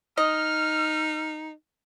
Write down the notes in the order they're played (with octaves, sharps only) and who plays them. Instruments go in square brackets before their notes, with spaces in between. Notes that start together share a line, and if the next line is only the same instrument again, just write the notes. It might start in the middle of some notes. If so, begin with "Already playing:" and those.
[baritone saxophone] D#4 [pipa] D#5 [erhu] F6